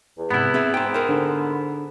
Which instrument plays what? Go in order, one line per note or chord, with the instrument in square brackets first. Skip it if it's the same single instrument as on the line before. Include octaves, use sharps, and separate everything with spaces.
[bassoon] E2
[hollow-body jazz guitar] G#2 C3 [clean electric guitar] B3 E4
[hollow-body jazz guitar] C4 G#4 E5
[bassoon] G#2 [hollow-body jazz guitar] B4 G5
[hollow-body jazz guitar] A#4 C5
[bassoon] G#2 [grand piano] D3